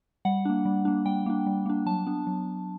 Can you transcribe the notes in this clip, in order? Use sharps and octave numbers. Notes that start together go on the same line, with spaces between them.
G3 F#5
A#3 D4
G3
A#3 D4
G3 G5
A#3 D4
G3
A#3 D4
F#3 A5
B3 D4
F#3